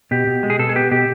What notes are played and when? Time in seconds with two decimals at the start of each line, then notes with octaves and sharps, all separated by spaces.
0.11 B2 G4
0.27 B2
0.43 G#3
0.50 G#4
0.59 B2 A4
0.69 G#4
0.76 B3 G4
0.91 B2 G4